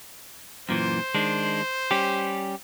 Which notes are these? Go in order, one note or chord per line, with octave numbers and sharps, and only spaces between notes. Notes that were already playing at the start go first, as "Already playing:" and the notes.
F#2 A#2 E3 C5
D#3 G#3 D4
G3 C#4 G4